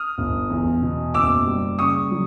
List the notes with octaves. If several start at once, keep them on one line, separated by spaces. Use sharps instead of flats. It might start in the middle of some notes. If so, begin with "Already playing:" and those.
Already playing: D#6 F6
G1
E2
B2
F#1 D6 E6
G3
C#3 C#6 D#6
F#3